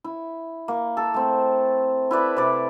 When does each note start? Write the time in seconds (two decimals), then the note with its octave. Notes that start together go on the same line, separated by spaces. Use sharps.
0.04 E4
0.68 A#3
0.97 A4
1.14 A3 C4
2.11 E4 B4 D5
2.37 C3 D5